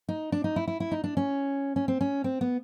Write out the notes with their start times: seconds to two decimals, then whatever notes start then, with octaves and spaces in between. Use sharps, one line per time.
0.09 D#4
0.32 D4
0.44 D#4
0.56 E4
0.68 E4
0.80 E4
0.92 D#4
1.04 D4
1.17 C#4
1.76 C#4
1.88 C4
2.01 C#4
2.24 C4
2.41 B3